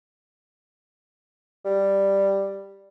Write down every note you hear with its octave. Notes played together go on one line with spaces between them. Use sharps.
G3